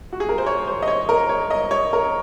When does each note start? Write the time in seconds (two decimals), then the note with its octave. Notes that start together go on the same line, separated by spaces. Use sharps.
0.13 F#4
0.20 G#4
0.29 A#4
0.38 C5
0.46 C#5
0.67 C5
0.82 D#5
0.88 C#5
1.09 A#4
1.29 C#5
1.50 D#5
1.71 C#5
1.93 A#4